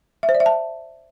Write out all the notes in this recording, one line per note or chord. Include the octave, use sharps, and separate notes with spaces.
E5
C5
D5
E5
A5